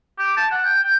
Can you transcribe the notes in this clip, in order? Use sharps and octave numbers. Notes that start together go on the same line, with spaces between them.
G4
A5
F#5
G5
G5